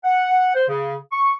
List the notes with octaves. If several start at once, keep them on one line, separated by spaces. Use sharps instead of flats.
F#5
C5
C#3
C#6